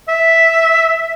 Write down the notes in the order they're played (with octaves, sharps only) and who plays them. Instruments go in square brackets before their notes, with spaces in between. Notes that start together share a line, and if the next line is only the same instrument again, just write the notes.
[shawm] E5